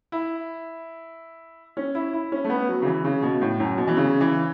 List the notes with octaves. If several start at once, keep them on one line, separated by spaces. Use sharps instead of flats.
E4
C#4
E4
E4
C#4
A3
B3
F#3
C#3
E3
C#3
B2
A2
F#2
B2
E3
C#3
E3